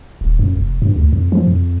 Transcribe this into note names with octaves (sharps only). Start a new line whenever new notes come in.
D#1
F#2
F1
G2
D2
F2
F3
F2